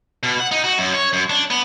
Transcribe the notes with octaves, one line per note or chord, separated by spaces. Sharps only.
B2
F#5
D#4
F#4
F#2
C#5
F#2
D4
B3